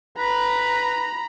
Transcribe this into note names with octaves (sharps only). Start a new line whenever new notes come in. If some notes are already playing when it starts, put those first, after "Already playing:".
B4 A#5 B5